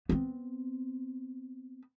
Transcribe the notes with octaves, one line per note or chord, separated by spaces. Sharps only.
B3 C4